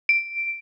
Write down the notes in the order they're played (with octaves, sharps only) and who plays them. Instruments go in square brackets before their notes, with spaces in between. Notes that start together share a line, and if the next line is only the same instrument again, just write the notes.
[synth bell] D7